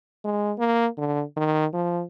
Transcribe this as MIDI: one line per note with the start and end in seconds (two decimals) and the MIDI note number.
0.25 0.54 56
0.59 0.87 58
0.98 1.23 50
1.37 1.66 51
1.73 2.03 53